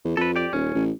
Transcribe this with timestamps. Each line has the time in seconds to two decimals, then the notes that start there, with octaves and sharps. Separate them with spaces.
0.05 E2
0.17 F2 A4 B4
0.36 G4 D5
0.53 D#1 C#4
0.75 A1